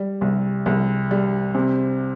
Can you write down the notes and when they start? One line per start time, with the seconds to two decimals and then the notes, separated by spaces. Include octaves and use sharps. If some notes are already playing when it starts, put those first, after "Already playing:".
Already playing: G3
0.21 C2
0.66 C2
1.11 G3
1.55 C3